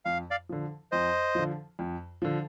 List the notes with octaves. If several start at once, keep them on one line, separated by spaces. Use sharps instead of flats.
F2 F5
D5 F5
D3 F3
F2 C5 D#5
D3 F3
F2
D3 F3